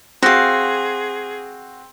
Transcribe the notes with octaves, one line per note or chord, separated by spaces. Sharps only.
C4 F#4 G#4 F5